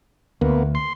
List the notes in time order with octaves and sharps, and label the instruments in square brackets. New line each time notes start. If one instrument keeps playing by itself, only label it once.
[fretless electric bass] D2 [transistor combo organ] A#3 B3
[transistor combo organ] C6